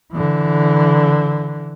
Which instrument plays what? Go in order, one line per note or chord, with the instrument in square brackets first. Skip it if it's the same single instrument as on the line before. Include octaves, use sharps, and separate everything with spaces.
[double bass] D3 E3